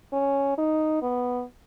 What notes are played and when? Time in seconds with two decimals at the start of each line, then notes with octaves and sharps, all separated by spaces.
0.13 C#4
0.58 D#4
1.02 B3